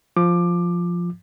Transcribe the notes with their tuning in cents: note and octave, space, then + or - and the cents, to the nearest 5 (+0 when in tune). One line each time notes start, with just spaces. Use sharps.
F3 +0 D6 +20